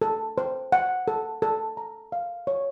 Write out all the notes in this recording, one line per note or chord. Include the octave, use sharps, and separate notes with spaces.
A4
C5
F#5
A4
A4
A#5
F5
C#5